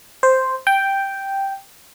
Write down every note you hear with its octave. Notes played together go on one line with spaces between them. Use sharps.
C5
G5